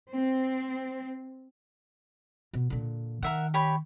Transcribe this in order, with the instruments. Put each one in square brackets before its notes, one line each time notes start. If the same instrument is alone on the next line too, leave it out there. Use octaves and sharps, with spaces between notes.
[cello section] C4
[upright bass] B2
A#2 D3
[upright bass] D#3 [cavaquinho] A#4 E5 F#5
[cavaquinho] G4 C#5 B5